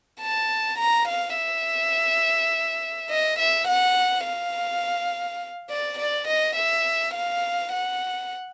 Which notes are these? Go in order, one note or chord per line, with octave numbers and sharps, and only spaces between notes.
A5
A#5
F5
E5
D#5
E5
F#5
F5
D5
D5
D#5
E5
F5
F#5